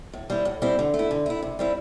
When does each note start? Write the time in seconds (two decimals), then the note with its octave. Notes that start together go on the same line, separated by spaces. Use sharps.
0.13 A2
0.30 G3 C4 E4
0.45 A2
0.62 G3 C4 E4
0.79 D3
0.94 A3
0.99 E4
1.11 D3
1.26 A3 E4
1.42 C3
1.59 G3 C4 E4